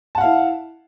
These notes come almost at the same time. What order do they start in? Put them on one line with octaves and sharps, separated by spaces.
A5 F#5 F5 E4